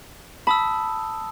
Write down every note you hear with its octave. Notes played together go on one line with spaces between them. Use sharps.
A5 B5 D#6 E6